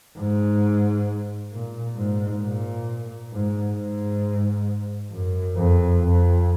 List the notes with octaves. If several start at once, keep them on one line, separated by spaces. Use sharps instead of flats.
G#2
A#2
G#2
A#2
G#2
G#2
F#2
F2
F2